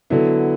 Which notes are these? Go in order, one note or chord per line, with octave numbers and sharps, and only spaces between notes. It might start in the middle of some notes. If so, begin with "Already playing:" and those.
D3 F#3 B3 E4